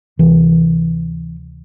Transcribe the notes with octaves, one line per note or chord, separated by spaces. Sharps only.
D2 C3 E3